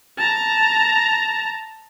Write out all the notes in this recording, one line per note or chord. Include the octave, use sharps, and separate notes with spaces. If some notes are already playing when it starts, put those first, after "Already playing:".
A5 A#5